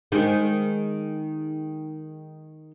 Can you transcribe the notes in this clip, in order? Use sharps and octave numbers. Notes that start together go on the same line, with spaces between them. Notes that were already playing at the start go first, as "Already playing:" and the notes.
D#3 G#3